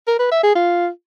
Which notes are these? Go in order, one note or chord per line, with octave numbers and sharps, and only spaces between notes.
A#4
B4
E5
G#4
F4